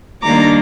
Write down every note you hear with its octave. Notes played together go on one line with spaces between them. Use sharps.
D#3 G3 A#3 D4 A#5 D6